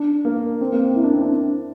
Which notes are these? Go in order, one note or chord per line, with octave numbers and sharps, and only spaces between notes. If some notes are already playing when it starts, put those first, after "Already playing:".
Already playing: D4
A#3
C4
A#3
C4
E4
D4
C4
D4